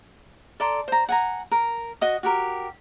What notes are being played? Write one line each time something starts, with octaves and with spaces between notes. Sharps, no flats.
A4 D5 A#5 C6
C5 A#5
F#5 G#5 A#5
A#4
F#4 D#5 D#6
F#4 G4 A#4